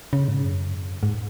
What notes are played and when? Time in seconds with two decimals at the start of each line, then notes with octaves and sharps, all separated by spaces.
0.13 C#3
0.28 G#2
0.43 F#2
1.03 G#2